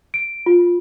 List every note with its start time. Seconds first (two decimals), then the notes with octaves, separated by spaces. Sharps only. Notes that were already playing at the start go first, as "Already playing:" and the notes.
0.14 D7
0.46 F4